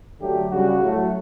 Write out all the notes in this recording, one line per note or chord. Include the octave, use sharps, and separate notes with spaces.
D3 F#3 A3 G4
C#3 G3 F#4
A2 F#3 A3